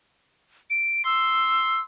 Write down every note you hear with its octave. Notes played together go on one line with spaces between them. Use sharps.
D7
C6 E6